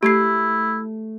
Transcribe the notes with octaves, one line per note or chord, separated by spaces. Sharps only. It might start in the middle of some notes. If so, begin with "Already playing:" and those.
A3 E4 G4 G#6 C7